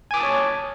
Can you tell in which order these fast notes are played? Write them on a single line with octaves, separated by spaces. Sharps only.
G#5 D6 D#6 A5 C#5